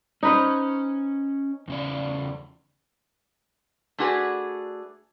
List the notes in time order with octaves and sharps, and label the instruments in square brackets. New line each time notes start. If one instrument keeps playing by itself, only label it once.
[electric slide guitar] C#4 [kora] D#4 B4 C5
[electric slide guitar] E2 C#3 D5
[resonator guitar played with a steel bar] A3 D4 F#4 G#4 B4